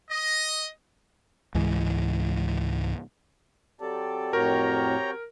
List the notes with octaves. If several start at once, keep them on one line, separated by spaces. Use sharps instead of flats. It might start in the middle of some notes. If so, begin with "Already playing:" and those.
D#5
C#2 G#2 E3
F#3 C4 G4 A4 D5
F2 A2 F#4 A#4 C#5 G5 A#5